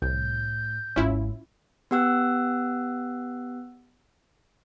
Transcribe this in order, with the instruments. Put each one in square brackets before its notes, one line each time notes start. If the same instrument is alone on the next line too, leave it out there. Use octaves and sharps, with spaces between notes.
[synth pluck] C2 [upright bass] A2 [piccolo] G6
[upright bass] G#1 D#2 [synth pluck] C#4 E4 F4
[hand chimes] B3 G4 F#5 E6 F#6